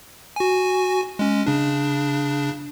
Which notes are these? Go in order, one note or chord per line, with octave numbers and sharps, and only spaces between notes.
F#4 G#5
G#3 C#4
C#3 D4